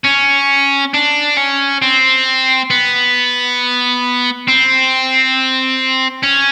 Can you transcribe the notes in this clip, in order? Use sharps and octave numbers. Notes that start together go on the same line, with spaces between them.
C#4
D4
C#4
C4
B3
C4
C#4